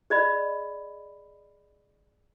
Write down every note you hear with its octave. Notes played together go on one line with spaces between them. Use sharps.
G#4 D5 D#5 B5